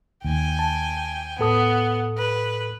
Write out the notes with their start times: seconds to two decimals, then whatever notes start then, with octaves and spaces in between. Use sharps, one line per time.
0.25 D#2 G5 G#5
0.59 A5
1.39 A2 B3 A4 D#6
2.18 B4